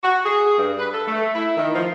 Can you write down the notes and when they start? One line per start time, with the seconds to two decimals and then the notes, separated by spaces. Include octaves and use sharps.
0.04 F#4
0.25 G#4
0.58 G2
0.79 B4
0.93 A4
1.07 A3
1.34 E4
1.57 D#3
1.75 F3